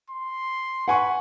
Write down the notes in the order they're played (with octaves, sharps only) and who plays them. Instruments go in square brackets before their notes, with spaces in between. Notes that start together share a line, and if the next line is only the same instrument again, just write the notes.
[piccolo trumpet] C6
[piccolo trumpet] B4 [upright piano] F#5 G#5 C#6